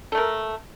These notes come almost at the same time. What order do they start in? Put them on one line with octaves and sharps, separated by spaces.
A4 A3 A#4